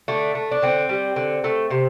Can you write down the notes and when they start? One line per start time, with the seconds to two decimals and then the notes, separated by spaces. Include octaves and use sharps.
0.08 D3 A3
0.35 A3
0.51 D4
0.62 D3 C4
0.89 G3
1.16 D3
1.44 A3
1.71 C3